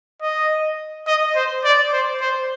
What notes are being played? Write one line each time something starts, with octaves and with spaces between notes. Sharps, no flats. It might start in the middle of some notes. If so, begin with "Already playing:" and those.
D#5
D#5
C5
D5
C5
C5